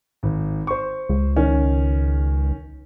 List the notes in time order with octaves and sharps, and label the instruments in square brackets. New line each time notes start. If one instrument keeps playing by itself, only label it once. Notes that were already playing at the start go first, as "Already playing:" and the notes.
[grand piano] G#1
C5 C#6
[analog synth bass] C#2
[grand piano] D#3 C#4